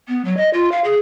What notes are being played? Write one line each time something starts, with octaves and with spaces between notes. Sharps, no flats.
B3
F#3
D#5
F4
F5
G#4